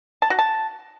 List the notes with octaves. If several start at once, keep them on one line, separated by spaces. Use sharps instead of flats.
A5
F#4
A5